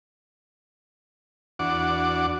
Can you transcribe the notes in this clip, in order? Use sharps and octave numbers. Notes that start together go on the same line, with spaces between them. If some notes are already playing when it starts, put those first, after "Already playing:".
E2 D4 F#4 F#5 D6